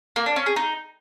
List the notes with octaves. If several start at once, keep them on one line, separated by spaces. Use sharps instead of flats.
A#3
D4
C#4
G#4
D#4